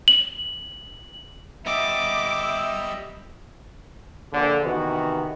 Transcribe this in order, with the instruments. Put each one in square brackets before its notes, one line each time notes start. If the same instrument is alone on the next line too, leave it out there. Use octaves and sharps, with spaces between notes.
[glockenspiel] F#7
[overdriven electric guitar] G3 B3 [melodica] D#5 E6 [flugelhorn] E5 [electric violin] D6
[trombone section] A#1 D3
C3 D#3 E3 B3 F#4